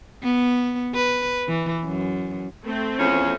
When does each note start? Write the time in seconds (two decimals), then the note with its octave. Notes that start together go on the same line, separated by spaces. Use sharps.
0.23 B3
0.95 B4
1.48 E3
1.85 F#2
2.64 A3 C4
2.99 E2 F3 C#4